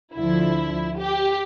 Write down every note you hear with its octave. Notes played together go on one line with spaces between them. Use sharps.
D2 D3 F3 E4
G4